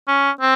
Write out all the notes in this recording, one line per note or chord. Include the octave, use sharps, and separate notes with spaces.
C#4
C4